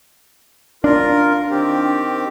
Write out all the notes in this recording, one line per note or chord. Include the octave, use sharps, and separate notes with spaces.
D4 F4 A#4
D#3 C4 G4